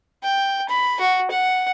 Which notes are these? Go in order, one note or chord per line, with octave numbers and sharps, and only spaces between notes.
G5
B5
F#4
F#5